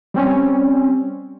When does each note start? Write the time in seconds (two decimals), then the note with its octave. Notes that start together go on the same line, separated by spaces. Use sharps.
0.14 G3 C4 C#4